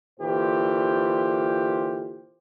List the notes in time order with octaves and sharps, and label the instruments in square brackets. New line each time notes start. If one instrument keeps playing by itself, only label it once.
[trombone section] A#2 D3 E3 F4 G4 C5